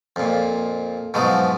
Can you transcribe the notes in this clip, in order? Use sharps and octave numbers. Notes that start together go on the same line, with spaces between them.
F2 A#2
G#2 B2 F3 F#3 D#4